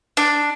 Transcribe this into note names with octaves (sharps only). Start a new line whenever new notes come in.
D4